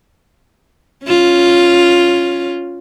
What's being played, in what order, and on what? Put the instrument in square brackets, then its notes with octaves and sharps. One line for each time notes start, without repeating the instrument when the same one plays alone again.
[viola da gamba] C#4 F4